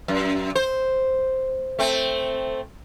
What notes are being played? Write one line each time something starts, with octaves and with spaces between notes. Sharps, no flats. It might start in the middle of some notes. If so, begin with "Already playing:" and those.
F#2
C5
A3 C4